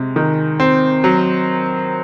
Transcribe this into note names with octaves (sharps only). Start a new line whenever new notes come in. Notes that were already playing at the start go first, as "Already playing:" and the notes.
Already playing: C3 G#3
D#3
C4
F#3